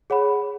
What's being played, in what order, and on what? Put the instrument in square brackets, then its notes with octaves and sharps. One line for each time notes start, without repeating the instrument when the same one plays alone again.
[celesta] G#4 C#5 F#5 B5